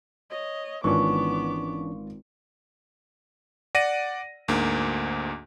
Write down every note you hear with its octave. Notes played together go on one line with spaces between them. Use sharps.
C#5 D#5
G#1 E3 B3 C#4 D4 F4 C#6 D6
D5 F#5 A#6 D#7
D2 G#2 A#3